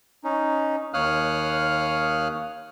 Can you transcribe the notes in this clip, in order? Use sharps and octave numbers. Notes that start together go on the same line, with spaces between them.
C#4 D#4
D#2 C#5 F5 D#6 F6 F#6